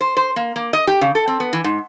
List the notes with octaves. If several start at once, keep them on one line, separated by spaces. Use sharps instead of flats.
C5
C5
A#3
A#3
D#5
G4
C#3
A4
C4
B3
E3
G#2